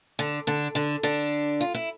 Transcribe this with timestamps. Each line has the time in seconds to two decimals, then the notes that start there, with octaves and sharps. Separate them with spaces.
0.19 D3 D4
0.47 D3 D4
0.75 D3 D4
1.03 D3 D4
1.61 F4
1.74 E4